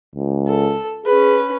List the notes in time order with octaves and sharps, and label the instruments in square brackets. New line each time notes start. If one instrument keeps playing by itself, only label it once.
[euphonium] C#2
[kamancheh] A4
[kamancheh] C#4 B4 [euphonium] G#4